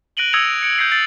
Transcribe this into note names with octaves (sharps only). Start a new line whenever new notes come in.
F#6 A#6 D7 D#7 F#7 G7
D#6 E6 G#6 A#6 C#7 F7
D7
C#7 D7
G6 G#6 A#6 C7 C#7
A6 C7 F#7